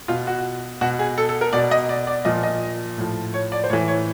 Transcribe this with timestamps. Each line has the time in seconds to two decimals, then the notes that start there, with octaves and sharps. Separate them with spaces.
0.08 B2 F4
0.27 F#4
0.81 B2 F#4
0.99 G#4
1.18 A4
1.29 A4
1.41 A#4
1.53 B2 D5
1.71 D#5
1.89 D5
2.07 D5
2.25 A#2 F3 D#5
2.43 D#5
2.98 A2 F3
3.34 C#5
3.52 D5
3.64 C5
3.70 A2 E3 C#5
3.88 C#5